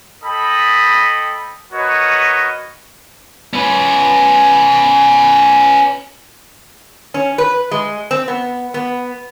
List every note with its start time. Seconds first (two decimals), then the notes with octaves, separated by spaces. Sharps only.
0.24 A4 D#5 G5 B5
1.73 F#4 A#4 B4 C#5 D#5
3.53 C#4 B4
7.14 C#4
7.38 B4
7.71 G#3
8.11 C4
8.28 B3
8.74 B3